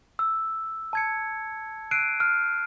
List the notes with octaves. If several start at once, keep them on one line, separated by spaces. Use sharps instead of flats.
E6
A5 G#6 C#7
E6 F#6 C7 D7 D#7
F6